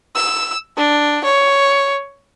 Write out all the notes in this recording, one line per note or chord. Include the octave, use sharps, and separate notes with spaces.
E6
D4
C#5